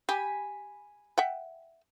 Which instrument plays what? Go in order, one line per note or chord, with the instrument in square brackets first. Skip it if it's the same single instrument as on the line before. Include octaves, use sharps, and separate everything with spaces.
[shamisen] G4 [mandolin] G#5 B5
[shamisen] E5 F#5 G5